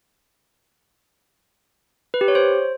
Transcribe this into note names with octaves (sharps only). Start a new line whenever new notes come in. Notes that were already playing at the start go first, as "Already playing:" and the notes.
B4
G4
C#5
C5